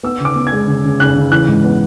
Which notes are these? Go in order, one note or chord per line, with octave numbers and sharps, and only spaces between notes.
B3 E6
C#3
D6
B3
G#6
G#3
C#3
C#3
C#3 F#6
C#3
E3 F#6
G#2
B3